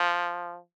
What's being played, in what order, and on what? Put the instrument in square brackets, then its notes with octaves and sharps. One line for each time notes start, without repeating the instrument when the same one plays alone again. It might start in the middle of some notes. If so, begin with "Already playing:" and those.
Already playing: [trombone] F3